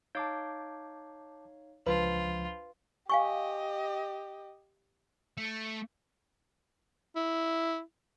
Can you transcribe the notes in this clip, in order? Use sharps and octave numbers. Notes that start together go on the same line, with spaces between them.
D#4 C#5 F5 A5 D6 G6
C#2 F3 D4 F4 B4 C5 B5
G4 D#5 F5 G#5 C#6
A3
E4